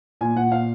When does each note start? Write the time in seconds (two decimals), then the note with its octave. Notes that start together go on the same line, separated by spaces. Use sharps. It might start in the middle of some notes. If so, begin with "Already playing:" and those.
0.21 A#2 G#5
0.36 A#2 F#5
0.52 A#2 F5